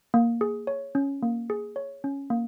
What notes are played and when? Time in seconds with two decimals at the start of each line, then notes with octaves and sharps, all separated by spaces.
0.14 A#3
0.41 G#4
0.67 C#5
0.95 C#4
1.22 A#3
1.50 G#4
1.76 C#5
2.04 C#4
2.30 A#3